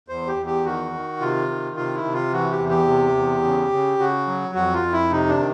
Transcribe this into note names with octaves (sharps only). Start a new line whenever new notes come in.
E2 C5
G4
E2
G4
D#3 F#4
D#3
C3 F4
D#3
C3 F4
E4
C3
F4
E3 F#4
G4
E2
G4
C3
E2
C#3
C#3
C#3 F#4
F#3
F2 F#4
F4
F2
E4
C3 D#4
D4
D#3